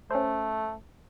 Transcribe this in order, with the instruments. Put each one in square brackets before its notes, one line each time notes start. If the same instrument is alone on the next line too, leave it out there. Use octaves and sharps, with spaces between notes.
[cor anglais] A3 [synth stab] C#4 C5